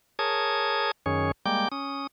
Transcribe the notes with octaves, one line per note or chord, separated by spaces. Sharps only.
G#4 A#4 C#5 A5 D#6 G#6
F#2 D#3 C#4 G#4 C#5
G3 G#3 A#3 G5 D6 G6
C#4 D#6